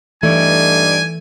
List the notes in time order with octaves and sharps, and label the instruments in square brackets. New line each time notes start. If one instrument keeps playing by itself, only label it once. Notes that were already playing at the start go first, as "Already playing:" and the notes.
[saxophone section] G2 D#4 D5 [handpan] E3 [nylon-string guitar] A3 [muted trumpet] G#5